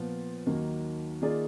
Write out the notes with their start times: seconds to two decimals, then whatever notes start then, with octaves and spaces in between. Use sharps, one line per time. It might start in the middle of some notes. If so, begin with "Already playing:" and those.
Already playing: A#2 F3 B3 F4
0.46 D#2 D#3 F#3 A#3
1.21 D#3 A#3 F4 G#4 D5